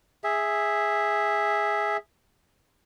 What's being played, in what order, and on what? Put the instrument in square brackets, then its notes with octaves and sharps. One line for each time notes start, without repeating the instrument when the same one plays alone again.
[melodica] G#4 E5